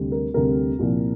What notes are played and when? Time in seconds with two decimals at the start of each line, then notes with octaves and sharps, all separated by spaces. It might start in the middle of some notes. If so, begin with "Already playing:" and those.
Already playing: D2 C3 G3
0.12 A#4
0.34 D2 C3 G3 A#4
0.79 C2 A#2 F3